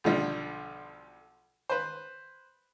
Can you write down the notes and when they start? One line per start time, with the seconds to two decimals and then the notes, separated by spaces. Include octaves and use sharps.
0.04 B1 D3 F3 G3
1.70 B4 C5